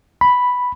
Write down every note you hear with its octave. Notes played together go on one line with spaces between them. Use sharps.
B5